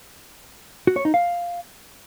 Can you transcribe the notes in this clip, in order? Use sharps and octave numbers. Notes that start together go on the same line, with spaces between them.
F#4
C#5
D#4
F5